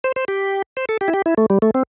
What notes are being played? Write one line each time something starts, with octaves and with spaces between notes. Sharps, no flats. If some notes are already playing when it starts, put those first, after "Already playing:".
C5
C5
G4
C5
A4
G4
E4
G4
E4
A3
G3
A3
C4